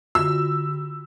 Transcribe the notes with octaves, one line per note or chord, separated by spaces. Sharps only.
D3 F4 F#4 E6